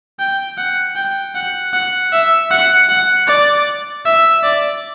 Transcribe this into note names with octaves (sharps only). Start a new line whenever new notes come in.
G5
F#5
G5
F#5
F#5
E5
F#5
F#5
D5
E5
D5